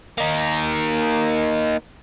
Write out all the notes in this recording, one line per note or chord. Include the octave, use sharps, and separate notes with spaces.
A#3 D#4